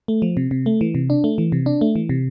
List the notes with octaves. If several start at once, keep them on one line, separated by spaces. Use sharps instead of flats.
A3
F3
C3
C3
A3
E3
C3
D4
A3
E3
C3
D4
A3
E3
C3